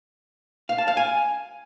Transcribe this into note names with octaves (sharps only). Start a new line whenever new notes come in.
F5
A5
F5
G#5